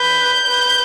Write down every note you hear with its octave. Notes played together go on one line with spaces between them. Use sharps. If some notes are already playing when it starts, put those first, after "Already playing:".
Already playing: B4 G6
B4